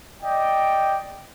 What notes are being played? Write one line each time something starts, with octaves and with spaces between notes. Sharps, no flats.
D5 D#5 G5